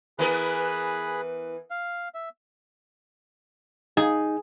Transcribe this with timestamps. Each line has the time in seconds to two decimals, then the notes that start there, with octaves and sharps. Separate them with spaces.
0.19 E3 B3 G#4 A#4 B5 F#6
1.71 F5
2.15 E5
3.97 D#4 G#4